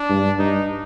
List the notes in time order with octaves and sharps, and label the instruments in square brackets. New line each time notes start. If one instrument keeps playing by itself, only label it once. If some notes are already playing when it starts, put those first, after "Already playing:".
Already playing: [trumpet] D4
[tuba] G2
[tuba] G2 [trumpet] D#4